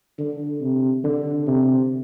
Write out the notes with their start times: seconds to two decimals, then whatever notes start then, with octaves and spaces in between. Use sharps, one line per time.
0.19 D3
0.61 C3
1.04 D3
1.47 C3